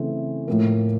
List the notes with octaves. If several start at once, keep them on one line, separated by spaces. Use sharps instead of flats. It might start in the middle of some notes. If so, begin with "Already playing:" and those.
Already playing: C#3 E3 A3 C4
A2 F3 A#3